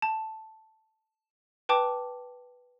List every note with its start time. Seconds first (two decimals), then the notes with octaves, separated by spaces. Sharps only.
0.02 A5
1.69 B4 G5 A5 D6